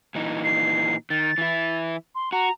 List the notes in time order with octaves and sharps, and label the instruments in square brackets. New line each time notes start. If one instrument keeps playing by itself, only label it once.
[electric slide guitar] A#2 E3 D#4
[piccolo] C7
[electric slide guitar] D#3 [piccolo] A6
[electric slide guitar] E3 E4
[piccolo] C6
[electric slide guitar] F#4 [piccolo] A#5